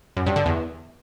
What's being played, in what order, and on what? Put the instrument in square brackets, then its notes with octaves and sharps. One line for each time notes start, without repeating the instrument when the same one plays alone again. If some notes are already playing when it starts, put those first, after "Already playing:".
[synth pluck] F#2
G2
D3
E2